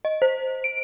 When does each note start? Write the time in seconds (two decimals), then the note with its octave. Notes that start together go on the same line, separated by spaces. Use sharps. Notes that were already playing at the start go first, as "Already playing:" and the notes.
0.05 D#5
0.22 C5
0.64 D7